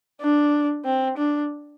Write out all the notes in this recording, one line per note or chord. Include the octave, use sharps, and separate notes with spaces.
D4
C4
D4